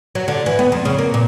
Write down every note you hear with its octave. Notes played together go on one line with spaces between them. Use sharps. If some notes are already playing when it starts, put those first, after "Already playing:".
F#3
D3
E3
B3
F2
C#3
A#3
A#2